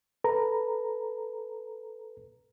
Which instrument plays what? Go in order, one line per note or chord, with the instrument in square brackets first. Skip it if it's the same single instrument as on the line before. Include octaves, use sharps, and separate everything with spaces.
[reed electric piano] A4 B4 A#5